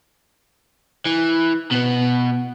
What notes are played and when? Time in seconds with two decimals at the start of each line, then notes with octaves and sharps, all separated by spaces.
1.07 E3
1.72 B2 B3